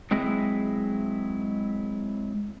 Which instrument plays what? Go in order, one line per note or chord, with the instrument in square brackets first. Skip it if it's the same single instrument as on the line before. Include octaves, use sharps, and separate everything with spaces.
[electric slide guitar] F#3 G#3 C4 E4 G#4 D#5